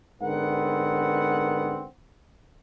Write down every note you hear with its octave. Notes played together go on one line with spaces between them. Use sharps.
G#2 D3 B3 C4 A#4 F#5